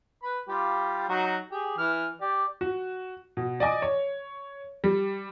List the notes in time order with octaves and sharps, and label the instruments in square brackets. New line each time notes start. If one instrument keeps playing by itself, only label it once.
[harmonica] B4 B5
G3 F4 G4
F#3 D#4 F#4
G4 G#4
E3 F6
G4 D5
[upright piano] F#4
B2
D5 D#5 G#5 D6
C#5
G3